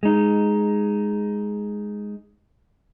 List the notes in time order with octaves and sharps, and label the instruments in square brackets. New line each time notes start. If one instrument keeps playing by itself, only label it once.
[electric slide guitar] G#3 D#4